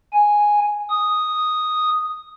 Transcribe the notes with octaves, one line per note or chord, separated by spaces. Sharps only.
G#5
D#6